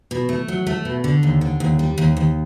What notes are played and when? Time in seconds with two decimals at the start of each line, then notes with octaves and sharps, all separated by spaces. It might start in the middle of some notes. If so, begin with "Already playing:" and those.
0.11 B2
0.29 A3
0.48 F#3
0.67 A3
0.85 B2
1.04 D3
1.23 D#2
1.41 D3
1.60 D#2
1.79 G3
1.98 D#2
2.17 D#2